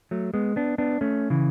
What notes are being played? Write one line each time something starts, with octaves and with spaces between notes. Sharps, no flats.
F#3 A3
G#3 B3
B3 D4
B3 D4
A3 C#4
C#3 E3